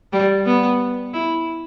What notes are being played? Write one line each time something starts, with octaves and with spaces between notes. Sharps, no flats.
G3
B3
E4